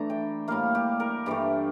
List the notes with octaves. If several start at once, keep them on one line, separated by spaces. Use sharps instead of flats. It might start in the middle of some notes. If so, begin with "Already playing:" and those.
Already playing: E3 A3 D4 A#5
G5
A2 G3 A#3 F5
G4
A#4
G2 E3 A3 G4